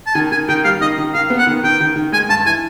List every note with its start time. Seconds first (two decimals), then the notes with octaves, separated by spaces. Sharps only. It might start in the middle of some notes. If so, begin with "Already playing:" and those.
0.07 A5
0.15 D#3 G#5
0.32 D#3 G#5
0.49 D#3 G5
0.65 G3 F5
0.81 D#3 D#5
0.98 D#3
1.14 D#3 F5
1.30 B3
1.38 F#5
1.47 D#3
1.63 D#3 G5
1.80 D#3
1.96 D#3
2.12 G#3 G#5
2.29 G2 A5
2.46 E3 G#5